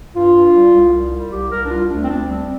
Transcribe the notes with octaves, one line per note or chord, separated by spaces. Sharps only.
G2 F4
G2
G3
C2
C2
G3
C2 G4
C2 A#4
D4
G3 F4
D2 D4
C4
D2 D4
G3 C4